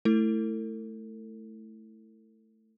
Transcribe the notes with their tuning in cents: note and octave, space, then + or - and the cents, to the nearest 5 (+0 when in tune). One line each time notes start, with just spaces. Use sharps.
A3 +0 E4 +0 A4 +45